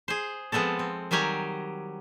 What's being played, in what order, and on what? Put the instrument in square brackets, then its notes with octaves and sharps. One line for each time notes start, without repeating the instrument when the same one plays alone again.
[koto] G#4 C5
F3 G#3 B3 C4 A4
C4
D#3 F#3 G3 G4 G#5 A#5